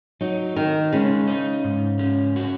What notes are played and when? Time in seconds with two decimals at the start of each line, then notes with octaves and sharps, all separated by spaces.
0.21 F#3 D#4
0.56 D#3 A#4
0.93 C#3 G#3
1.28 D#4
1.64 G#2
1.99 C#4
2.36 F#4